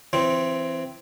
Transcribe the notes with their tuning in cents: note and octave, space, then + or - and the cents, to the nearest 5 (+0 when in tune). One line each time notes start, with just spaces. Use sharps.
E3 +25 C4 +0